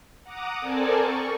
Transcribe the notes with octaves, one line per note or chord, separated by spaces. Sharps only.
F#5 A#5 D6 D#6
C4 A4 A#4 D5 G#5 A5
C#6